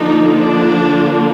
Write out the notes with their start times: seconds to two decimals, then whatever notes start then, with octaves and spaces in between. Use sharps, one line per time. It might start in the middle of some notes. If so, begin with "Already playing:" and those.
Already playing: D3 F3 A#3 D4 D#4
0.35 D4